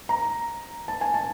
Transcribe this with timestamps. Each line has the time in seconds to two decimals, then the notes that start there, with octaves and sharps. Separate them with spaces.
0.09 A#5
0.88 A5
1.01 G#5
1.14 A5